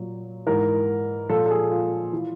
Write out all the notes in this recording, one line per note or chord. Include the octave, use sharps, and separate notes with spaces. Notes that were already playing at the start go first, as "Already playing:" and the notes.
Already playing: A#2 F#3
G#2 E3 A#4
A#2 F3 A4
A4
G#4
F4
E3